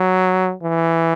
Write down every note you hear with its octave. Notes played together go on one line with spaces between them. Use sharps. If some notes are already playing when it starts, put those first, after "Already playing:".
Already playing: F#3
E3